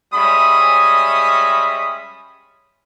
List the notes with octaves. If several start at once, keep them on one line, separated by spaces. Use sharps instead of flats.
G3 G#3 C#4 E5 B5 D#6